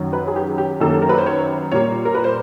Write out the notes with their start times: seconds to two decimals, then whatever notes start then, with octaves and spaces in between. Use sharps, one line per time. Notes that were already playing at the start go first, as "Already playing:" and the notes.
Already playing: F#2 D#3 F#3
0.13 B4
0.27 G#4
0.36 G4
0.58 G4
0.80 F#2 D#3 F#3 A#3 A4
1.02 A#4
1.09 B4
1.18 C5
1.26 C#5
1.72 A#2 G3 A#3 C#5
2.05 A#4
2.15 B4
2.24 C5